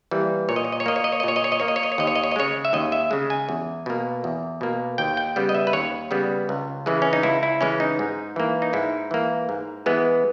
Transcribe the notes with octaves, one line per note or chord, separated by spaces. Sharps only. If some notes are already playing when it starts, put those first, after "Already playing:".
E3 G3 A#3
A#2 C#5
D#5
C#5
D#5
C#5
A#3 D#5
C#5
D#5
C#5
D#5
A#2 C#5
D#5
C#5
D#5
A#3 C#5
D#5
C#5
D#5
C#5
D#2 D#5
C#5
D#5
C#5
D#5
C#3 G#3 C#5
E5
D#2 D#5
E5
C#3 G#3
G#5
E2
B2 A#3
E2
B2 A#3
D#2 G5
G5
C#3 G3 B3
D#5
E5
B4
D#2 C#5
C#3 G3 B3
C#2
C#3 E3 G#3
C#4
D#4
C#2 E4
E4
C#3 E3 G#3 C#4
D#4
G#2
E3 A#3
D#4
G#2 E4
E3 A#3
G#2
E3 G#3 B3